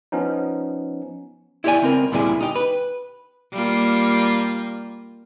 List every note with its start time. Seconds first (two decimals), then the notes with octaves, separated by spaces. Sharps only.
0.12 F3 B3 C#4 D#4
1.64 E4 G4 D5 G#5
1.82 C#2 C4 A#4
2.12 D2 A#2 G3 E4 G#4
2.41 D#4 G4
2.56 B4
3.53 G3 A#3 F4